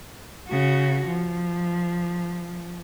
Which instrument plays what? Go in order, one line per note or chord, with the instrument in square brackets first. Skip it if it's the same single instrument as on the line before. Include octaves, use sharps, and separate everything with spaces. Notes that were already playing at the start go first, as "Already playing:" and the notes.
[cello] C#3 F#4
F3